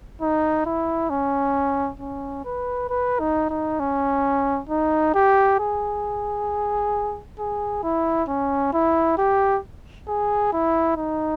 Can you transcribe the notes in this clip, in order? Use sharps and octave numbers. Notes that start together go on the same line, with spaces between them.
D#4
E4
C#4
C#4
B4
B4
D#4
D#4
C#4
D#4
G4
G#4
G#4
E4
C#4
E4
G4
G#4
E4
D#4